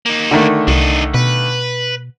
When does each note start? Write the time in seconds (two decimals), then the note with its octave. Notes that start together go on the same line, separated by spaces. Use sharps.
0.06 A#3 D#4
0.31 D3 D#3 A3
0.68 C2 D4 D#4
1.14 B2 B4